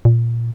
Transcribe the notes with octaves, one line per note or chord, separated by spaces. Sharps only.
A#2